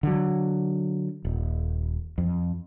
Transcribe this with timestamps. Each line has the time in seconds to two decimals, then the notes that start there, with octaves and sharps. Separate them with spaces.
0.03 D3 F#3
1.25 D#1
2.18 F2